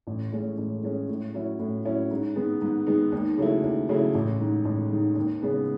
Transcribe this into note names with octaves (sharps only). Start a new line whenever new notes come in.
A1
A2 G#3 C#4
A1
A2 G#3 C#4
A2
F#3 C#4 E4
A2
F#3 C#4 E4
G#2
D#3 G#3 B3
G#2
D#3 G#3 B3
D#2
C#3 F#3 A3 E4
D#2
C#3 F#3 A3 E4
A1
G#2 D#3
A1
G#2 D#3
D#2
C#3 G#3 B3